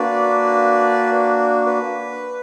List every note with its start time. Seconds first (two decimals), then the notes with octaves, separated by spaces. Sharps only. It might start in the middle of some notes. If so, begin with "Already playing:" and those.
Already playing: A#3 D4 F#4 B4 D5
1.66 B4